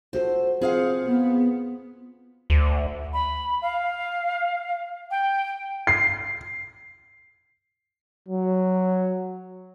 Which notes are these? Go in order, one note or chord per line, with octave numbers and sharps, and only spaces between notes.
F4 F#4 A4 C5
C4 F4 G#4 C5 F5 F#5
B3
D2
B5
F5
G5
C7
F#3